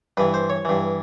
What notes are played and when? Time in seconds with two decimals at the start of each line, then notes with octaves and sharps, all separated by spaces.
0.17 G2 E3 B4
0.34 C5
0.50 C#5
0.65 G2 E3